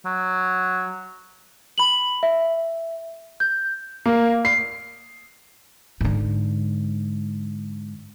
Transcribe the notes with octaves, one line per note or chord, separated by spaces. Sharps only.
F#3
B5 F#7
E5
G6
A#3
C7
G#2 D3